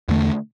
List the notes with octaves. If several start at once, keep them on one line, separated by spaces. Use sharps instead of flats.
E2 D3 A3